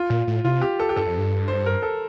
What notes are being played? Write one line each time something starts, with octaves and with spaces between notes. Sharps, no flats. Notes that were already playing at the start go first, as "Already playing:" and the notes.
Already playing: F4
A#2
A2
C3 F4
G4
A4
G4
G2 A4
F2
G2
C5
A#4
A4